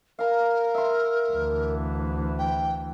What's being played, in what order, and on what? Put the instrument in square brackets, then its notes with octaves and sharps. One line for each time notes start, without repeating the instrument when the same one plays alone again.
[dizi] A#4 [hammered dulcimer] F5 A#5
[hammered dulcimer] E5 C6
[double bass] D2 E3
[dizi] G5